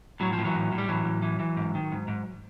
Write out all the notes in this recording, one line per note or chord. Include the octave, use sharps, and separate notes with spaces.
A2 F#3
F3
A2
E3 F#3
A2
A2
G3
A2 E3 F#3
A2
E3
E3
G#2
D#3
G#2
G#2